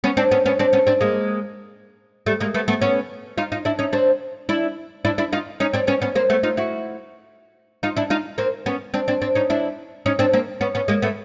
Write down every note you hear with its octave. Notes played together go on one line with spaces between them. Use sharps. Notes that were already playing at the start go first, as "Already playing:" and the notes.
B3 C#4
C4 D4
B3 C#4
B3 C#4
C4 D4
B3 C#4
C4 D4
G#3 A#3
G3 A3
G#3 A#3
A3 B3
A3 B3
B3 C#4
D#4 F4
D#4 F4
D4 E4
C#4 D#4
C4 D4
D4 E4
D4 E4
D4 E4
D#4 F4
C#4 D#4
C4 D4
B3 C#4
B3 C#4
A#3 C4
A3 B3
D#4 F4
E4 F#4
D#4 F4
D4 E4
D#4 F4
A#3 C4
B3 C#4
C4 D4
C4 D4
C4 D4
C#4 D#4
D4 E4
C#4 D#4
C4 D4
A#3 C4
B3 C#4
B3 C#4
G#3 A#3
A3 B3